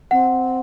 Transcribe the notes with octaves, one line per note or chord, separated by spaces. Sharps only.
C4 F#5